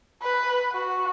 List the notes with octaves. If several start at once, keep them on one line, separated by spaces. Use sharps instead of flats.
B4
F#4